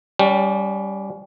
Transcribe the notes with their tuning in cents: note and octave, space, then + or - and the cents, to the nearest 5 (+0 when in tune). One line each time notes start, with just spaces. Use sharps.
G3 +0 C#4 +30